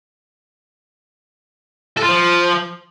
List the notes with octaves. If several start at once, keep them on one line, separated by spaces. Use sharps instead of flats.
A4
F4
F3